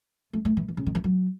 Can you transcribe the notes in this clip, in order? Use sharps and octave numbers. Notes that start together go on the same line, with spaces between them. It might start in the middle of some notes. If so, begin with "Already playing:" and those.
A3
A3
E3
E3
C#3
D#3
E3
F#3